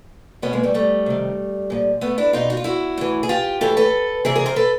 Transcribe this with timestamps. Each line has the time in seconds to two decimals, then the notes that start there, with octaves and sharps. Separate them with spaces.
0.42 B2 B3 C#4
0.53 G#3 A#3
0.63 G3 A3
0.74 G3 A3
1.06 C3 D#3
1.70 A#2 F3
2.01 A3 B3
2.18 D4 E4
2.33 B2 D#4 F4
2.50 F#4
2.57 F4
2.64 E4 F#4
2.98 A2 E3
3.23 G#4
3.29 F4 G4
3.61 A2 E3 G4 A4
3.77 A4 B4
4.25 C3 E3 G#4 A#4
4.36 G#4 A#4
4.46 A#4 C5
4.56 A4 B4